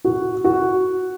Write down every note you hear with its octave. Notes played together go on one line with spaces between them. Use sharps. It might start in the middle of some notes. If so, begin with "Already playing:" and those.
F#4
F#4